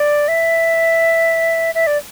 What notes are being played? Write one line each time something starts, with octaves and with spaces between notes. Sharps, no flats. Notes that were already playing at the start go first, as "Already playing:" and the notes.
Already playing: D5
E5
E5
D5